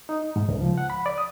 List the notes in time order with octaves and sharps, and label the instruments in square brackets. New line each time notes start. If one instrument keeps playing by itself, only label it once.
[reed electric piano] D#4
G#2
C#2
F3
F#5
B5
D5
D#6